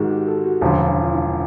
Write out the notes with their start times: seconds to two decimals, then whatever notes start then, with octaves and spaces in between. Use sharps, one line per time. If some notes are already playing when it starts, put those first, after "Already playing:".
Already playing: G#2 D#3 G#3 F#4 G4
0.10 G4
0.27 A4
0.44 F#4
0.61 E1 D2 C#3 F3 E4
1.01 F4
1.12 E4